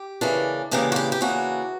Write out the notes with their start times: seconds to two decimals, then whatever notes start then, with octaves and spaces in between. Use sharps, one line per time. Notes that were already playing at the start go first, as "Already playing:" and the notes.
Already playing: G4
0.21 C#3 E3 A#3 D4
0.71 C#3 E3 A#3 D4 G4
0.92 F#4
0.96 G4
1.12 G4
1.21 C#3 E3 A#3 D4 F#4